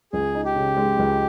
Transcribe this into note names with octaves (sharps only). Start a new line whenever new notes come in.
C#2 G#4
D#4
G4
C#3
G#3
C#2